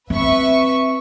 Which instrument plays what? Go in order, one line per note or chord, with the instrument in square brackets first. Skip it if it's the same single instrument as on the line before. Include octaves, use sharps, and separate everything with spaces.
[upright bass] C4 [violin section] B4 E5 C#6